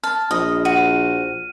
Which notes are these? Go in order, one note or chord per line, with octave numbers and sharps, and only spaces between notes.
A5 F6
A#1 D#5
F#4 D#7